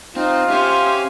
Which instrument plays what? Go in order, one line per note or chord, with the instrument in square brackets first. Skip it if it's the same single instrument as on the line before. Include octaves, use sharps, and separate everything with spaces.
[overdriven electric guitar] C4 [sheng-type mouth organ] D#4 [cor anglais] F4
[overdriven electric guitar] C#4 [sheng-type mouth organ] G4 F5 G#5 [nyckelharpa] C5 E5